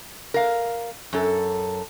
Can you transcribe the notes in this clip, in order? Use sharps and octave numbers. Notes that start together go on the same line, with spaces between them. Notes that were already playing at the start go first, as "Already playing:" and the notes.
A#4 F5
F#2 A4